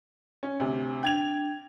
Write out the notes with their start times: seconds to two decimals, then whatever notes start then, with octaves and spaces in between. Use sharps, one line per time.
0.43 C#4
0.60 D2 C3
1.03 D4 G5 G#6 F7